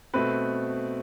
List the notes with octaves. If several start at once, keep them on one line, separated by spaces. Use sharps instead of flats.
B2 A3 C4 B4